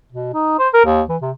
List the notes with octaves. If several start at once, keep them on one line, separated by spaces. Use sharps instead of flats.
B2
D#4
C5
A#4
D#2
E3
C3